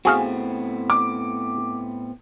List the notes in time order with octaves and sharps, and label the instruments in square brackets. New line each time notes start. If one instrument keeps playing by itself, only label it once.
[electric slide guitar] A2 B3 C4 [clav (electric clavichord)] F#4 G#4 F5
[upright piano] D6